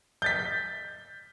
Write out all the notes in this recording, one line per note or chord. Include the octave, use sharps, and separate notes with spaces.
G6 A6 B6